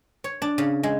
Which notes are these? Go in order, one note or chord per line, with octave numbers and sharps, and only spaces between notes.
C#5
D4
C#3
G#3